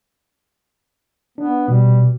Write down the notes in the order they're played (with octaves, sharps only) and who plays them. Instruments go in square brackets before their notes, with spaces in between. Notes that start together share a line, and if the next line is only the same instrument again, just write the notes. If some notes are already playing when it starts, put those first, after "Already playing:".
[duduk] B3 [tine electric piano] D4
[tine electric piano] B2 [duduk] G3